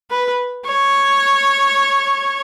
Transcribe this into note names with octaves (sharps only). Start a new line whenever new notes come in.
B4
C#5